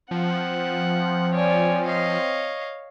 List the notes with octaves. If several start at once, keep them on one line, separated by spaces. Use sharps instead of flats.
F3 C4 F#5
C#5 D5 G#5
C#5 D#5 F5